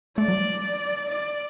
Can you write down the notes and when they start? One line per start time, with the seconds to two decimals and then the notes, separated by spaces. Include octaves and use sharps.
0.18 A3 D5
0.28 F#3
0.33 G3
1.10 D5